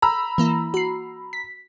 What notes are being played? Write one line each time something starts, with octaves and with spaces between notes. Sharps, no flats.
A#5 B5 E6
E3 A#3 E4
F#4 C7
B6